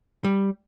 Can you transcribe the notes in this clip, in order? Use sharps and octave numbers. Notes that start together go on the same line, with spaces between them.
G3